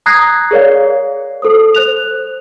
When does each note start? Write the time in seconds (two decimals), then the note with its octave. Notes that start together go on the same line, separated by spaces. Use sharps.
0.06 A#5 D#6 F#6 G#6 A#6 C7
0.51 G#4 A#4 C#5 D5 F5
1.42 A4 C5 D#6
1.75 C5 F#6 F7